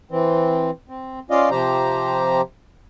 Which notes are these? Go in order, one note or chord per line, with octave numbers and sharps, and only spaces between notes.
E3 C4
C4
C#4 F4 D5 D#5 F5
C3 F3 G4 C5 A#5